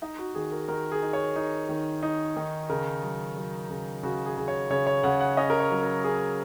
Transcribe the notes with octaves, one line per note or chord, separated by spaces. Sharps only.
D#4 D#5
F#4
D#3 G#4
A#4
D#3 A#4
G#4
D#4
C#5
D#4
D#3
D#4
D#3
C#3 A#4
F#3
F#3
C#3
C#3 F#4
G#4
C#3
C#5
C#3 C#5
C#5
C#3 F#5
F#5
C#4 D#5
A#4
C#5
F#3
A#4
C#4 G#4